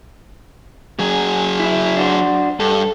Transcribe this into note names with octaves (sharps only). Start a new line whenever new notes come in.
F#2 F#3 G#4
E4 E5
D4 F#4 C5
G2 A4